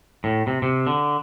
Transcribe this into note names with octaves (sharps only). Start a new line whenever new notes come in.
A2
C3
C3
D3